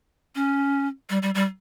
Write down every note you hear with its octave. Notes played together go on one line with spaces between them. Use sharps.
C#4
G3
G3
G3